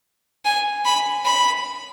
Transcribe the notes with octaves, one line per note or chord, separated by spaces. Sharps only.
G#5
B5
B5